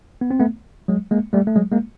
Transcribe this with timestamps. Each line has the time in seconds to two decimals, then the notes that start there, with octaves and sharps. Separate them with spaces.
0.21 B3
0.31 C4
0.40 A3 B3
0.88 F#3 G#3
1.11 G#3 A#3
1.33 G3 A3
1.47 A3
1.56 F#3 G#3
1.72 G#3 A#3